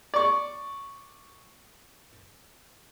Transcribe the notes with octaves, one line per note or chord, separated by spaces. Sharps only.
D5 C#6